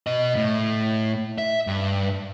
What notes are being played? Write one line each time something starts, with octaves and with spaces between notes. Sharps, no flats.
B2 D#5
A2
E5
G2